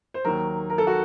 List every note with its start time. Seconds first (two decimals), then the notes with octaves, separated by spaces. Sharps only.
0.14 C5
0.25 D#2 D#3 F#3 A#4
0.70 A#4
0.78 A4
0.87 F#4